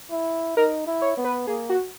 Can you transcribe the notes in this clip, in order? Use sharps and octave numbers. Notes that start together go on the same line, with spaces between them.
E4
D#4 A#4
E4
C#5
B3
B4
A#3 G#4
F#4